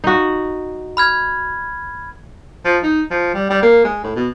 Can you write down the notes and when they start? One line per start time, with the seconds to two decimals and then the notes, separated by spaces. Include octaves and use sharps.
0.04 D#4 F#4
0.97 B5 F6 G#6
2.65 F3
2.83 D#4
3.11 F3
3.34 G3
3.50 G3
3.62 A#3
3.85 G#3
4.04 A2
4.16 B2